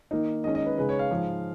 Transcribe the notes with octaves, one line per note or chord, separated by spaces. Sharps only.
D#3 A#3 D#4
D#3 G#3 C#4 D#5
D#5
B4
C#3 G#3 D#4 B4
C#5
F5
G#2 F3 G#3